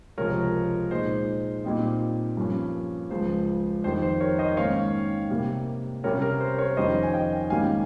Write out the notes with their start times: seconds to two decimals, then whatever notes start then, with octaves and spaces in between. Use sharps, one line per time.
0.18 C#2 C3 F3 G#3 A#4 C#5
0.91 A#2 G#3 D#4 C5
1.64 A#2 G3 C4 D#4
2.37 G2 F3 A#3 C#4
3.11 C#2 C#3 F3 C5
3.84 F2 D#3 G3 C5
4.02 C5
4.21 A#4 C#5
4.39 C5 D#5
4.57 G#2 D#3 A#3 C#4 C#5 F5
5.31 C3 G3 A#3
6.04 C3 G3 C#4 A#4 C#5
6.22 A#4
6.40 C5
6.59 A#4 C#5
6.77 F2 D#3 G3 C#4 C5 D#5
7.03 G#5
7.14 D#5 G5
7.50 G#2 D#3 G3 A#3 C#4 F5 G#5